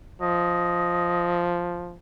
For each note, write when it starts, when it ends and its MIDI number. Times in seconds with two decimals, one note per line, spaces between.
0.22 1.98 53
0.22 1.52 75